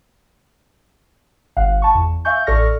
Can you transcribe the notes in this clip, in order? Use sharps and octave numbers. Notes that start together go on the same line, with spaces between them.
G1 F5 F#5
A5 C#6
E2
E5 F5 G#5 C#6 G6
A1 A4 D5 C#6 F6 A#6